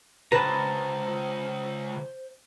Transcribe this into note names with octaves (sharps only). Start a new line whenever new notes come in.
C#2 B4 C5 A5 A#5